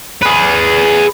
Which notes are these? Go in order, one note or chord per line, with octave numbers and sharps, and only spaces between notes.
G#4 B4